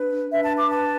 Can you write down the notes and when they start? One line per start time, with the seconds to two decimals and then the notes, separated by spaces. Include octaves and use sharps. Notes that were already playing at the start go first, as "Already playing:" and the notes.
Already playing: D4 B4
0.31 D4 B4 E5
0.43 A5
0.57 D6
0.70 A5